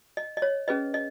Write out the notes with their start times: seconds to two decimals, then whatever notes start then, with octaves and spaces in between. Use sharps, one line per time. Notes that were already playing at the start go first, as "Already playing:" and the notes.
0.17 D#5
0.37 D#5
0.42 C#5
0.68 C#4 G#4 B4 D#5
0.94 D#5